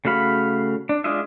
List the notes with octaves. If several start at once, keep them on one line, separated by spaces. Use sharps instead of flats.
C#3 A3 F#4 F5 B5
D4
G#3 D4 F4 D#5 E5